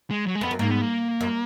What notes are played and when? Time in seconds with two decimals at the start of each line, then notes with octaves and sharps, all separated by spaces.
0.11 G#3
0.27 F#3
0.35 G#3
0.41 F2 B3
0.51 F#2
0.59 G#2 A#3
0.70 B3
0.81 A#3
1.21 F#2